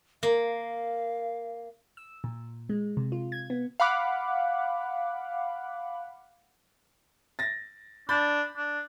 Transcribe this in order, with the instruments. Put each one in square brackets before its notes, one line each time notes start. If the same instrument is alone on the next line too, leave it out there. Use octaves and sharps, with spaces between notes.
[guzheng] A#3 [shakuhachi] F5
[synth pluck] E6
A#2
G#3
C3
F4
G#6
B3
[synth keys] F5 F#5 B5 D6 F#6
[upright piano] A6 A#6
[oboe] D4 [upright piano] B5 G6 A6
[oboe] D4